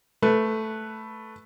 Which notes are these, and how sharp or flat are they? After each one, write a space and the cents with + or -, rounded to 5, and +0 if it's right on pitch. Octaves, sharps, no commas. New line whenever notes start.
A3 +0 B4 +0